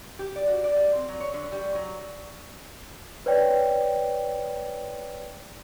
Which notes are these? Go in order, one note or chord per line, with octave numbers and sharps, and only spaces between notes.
G4
D5
F#4
D5
G3
C4
F#3
C#5
D3
G3
F#3
B4 C#5 D5 G5